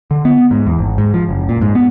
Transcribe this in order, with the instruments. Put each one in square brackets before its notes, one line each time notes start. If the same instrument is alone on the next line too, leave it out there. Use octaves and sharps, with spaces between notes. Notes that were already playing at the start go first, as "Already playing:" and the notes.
[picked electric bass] D3
B3
G#2
E2
G#1
G#2
F3
F#1
A#2
G#2
B3